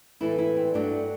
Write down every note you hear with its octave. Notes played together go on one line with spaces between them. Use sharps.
A2 E3 A3 E4
E4
C4
G2 F#3 A3 D4